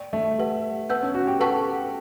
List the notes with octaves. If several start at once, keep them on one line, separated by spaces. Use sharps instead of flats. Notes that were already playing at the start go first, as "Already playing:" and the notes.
Already playing: D5 G5 C#6
A3
G4 B4 F#5
B3 B4 F#5 A5 E6 G6
C#4
F#4
G4
A4 B4 F#5 A5 C#6